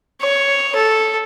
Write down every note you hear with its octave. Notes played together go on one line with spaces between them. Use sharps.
C#5
A4